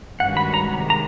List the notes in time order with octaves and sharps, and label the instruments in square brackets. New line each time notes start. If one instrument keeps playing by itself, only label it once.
[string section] G2 D#3 G#3 C#4 F#4 [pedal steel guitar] F#5
[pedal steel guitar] B5
A#5
[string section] C3 D#3 G#3
[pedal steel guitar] A#5